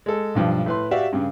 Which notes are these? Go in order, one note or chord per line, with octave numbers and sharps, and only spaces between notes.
G#3 A4
B1 G2 F3
A2 B4 C6
F#4 G4 D5 E5 F5
G2 C#3